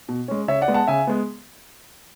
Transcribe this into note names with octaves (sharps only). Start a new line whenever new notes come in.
B2
G#3 C#4
C#3 C#5 E5
D5 F#5
G#3 B3
F#5 A5
C#3 E5 G#5
G#3 B3